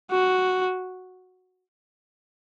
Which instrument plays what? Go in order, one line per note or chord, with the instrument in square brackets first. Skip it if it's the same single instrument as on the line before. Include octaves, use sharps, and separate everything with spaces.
[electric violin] F#4